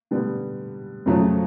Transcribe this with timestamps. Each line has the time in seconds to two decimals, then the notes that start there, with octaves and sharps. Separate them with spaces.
0.11 D3 G3 B3
1.06 F2 C#3 F#3 A3